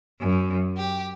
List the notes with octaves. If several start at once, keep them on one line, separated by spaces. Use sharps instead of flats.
F#2
G4